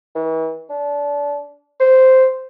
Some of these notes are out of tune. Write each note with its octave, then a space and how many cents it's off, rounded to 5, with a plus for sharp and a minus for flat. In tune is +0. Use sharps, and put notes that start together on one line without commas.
E3 -40
D4 -25
C5 -5